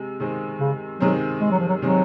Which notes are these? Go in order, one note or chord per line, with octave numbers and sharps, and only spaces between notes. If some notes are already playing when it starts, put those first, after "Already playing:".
Already playing: C3 G#3
C3 D#3 G#3 C4
C#3
C3 D#3 F#3 G#3 C4
G#3
F#3
F3
F#3
C3 D#3 F#3 G#3 C4